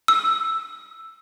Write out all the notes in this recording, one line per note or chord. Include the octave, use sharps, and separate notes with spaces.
E6